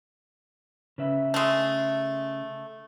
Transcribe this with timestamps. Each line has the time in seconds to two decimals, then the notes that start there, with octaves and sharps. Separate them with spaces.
0.98 C#3 B4 E5
1.34 G#3 A3